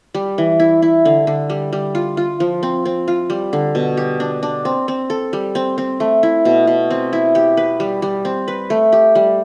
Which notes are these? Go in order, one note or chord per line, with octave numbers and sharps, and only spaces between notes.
G3
E3
E4
E4
D3
D3
G3
G3
F4
F4
F3
C4
C4
F4
G3
D3
B2
G4
D4
D4
C4
C4
A4
G3
C4
C4
A3
E4
B2
B2
C4
E4
G4
B4
G3
G3
C4
B4
A3
G4
G3